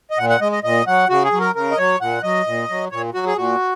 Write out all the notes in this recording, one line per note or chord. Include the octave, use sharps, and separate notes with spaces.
D#5
A#2 F#5
F#5
G#3 D#5
D#5
A#2 D#5
F#3 F#5
C#3 F#4
G#4
F#3
A#4
C#3 A#4
D#5
F#3 C#5
A#2 F#5
F#3 D#5
A#2
F#3
A#2 C#5
F#3 F#4
G#4
A#2 F#4